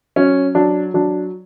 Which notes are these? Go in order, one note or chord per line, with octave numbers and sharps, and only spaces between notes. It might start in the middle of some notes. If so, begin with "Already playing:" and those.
F#3 C#4
F#3 D4
F#3 D4